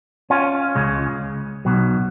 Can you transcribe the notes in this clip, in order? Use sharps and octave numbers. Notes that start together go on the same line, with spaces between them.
C#4 F4
C#2 C#3 G#3
B1 B2 F#3